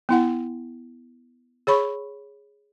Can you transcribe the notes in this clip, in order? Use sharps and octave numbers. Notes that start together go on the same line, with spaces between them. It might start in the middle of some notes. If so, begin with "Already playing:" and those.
B3 E4 F#5
G#4 C#5 B5 C#6